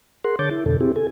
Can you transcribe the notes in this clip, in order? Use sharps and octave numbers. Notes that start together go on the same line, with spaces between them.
G#4 A#4 F#5 C6
D3 C#5 A5 D6 G6 A6
E4
F2 B2 D3 A4
C4 E4 G4 G#4
A4 G#5